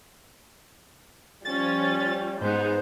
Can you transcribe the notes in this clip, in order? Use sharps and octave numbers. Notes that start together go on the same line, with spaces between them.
F3 G3 C#4 A6
G#2 G#3 B3 D#4 C5